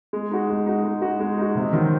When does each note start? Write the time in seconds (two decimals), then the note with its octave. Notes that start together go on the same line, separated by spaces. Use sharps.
0.13 G#3
0.31 D#4 F#4
0.50 G#3
0.66 D#4 F#4
0.84 G#3
1.02 D#4 F#4
1.20 G#3
1.38 D#4 F#4
1.55 C3
1.73 D#3 F#3 C4